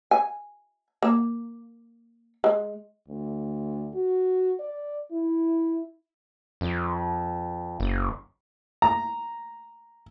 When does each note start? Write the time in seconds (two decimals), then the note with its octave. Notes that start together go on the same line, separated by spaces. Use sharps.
0.11 G#5
1.03 A#3
2.44 G#3
3.08 D2
3.94 F#4
4.59 D5
5.12 E4
6.61 F2
7.80 F#1
8.82 A#5